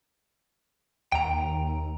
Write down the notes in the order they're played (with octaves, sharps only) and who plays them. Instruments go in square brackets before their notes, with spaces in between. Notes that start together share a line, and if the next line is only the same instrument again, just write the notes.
[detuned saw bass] D#2 [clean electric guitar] G5 A#5